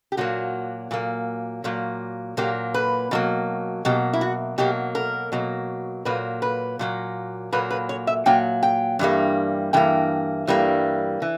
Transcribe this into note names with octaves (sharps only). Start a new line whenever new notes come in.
G4
A#2 F#3 A#3 F#4
A#2 F#3 A#3
A#2 F#3 A#3
A#2 F#3 A#3 G4
B4
B2 F#3 A#3
B2 F#3 A#3 G4
E4
F#4
B2 F#3 A#3 G4
A#4
B2 F#3 A#3
A#2 F#3 A#3 B4
B4
A#2 F#3 A#3
A#2 F#3 A#3 B4
B4
C#5
E5
A#2 F#3 A#3 G5
G5
G2 E3 G3 A#3
G2 E3 A#3 G5
G2 E3 G3 A#3
E3